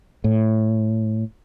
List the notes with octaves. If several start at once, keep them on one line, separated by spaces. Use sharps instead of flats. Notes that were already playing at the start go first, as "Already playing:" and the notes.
A2